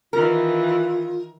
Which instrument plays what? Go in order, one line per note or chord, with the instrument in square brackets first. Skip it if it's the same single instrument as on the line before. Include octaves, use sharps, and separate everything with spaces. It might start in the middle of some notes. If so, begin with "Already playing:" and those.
[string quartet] D#3 E3 [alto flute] F4 [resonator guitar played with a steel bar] A#4